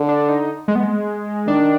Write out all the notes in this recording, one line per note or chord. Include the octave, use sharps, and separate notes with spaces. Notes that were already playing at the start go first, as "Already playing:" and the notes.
Already playing: D3
D4
D#4
G#3
B3
G#3
D#3 D4